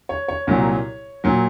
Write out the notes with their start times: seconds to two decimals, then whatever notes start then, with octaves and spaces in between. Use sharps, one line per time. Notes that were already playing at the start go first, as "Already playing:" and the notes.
0.09 C#5
0.28 C#5
0.47 C2 A#2 F#3
1.24 A#2 F#3